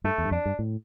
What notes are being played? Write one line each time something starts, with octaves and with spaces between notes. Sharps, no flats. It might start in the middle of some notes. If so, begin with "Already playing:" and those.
G2 A3
E2
G2
F2 D4
G2
A2